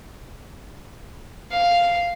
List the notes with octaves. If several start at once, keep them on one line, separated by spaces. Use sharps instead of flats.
F5